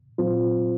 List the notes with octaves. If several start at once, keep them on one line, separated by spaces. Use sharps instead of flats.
A#2 F#3 C4 F4 C5